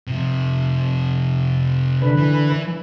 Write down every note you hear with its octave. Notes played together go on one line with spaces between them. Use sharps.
C3 F3
D3 B4
E3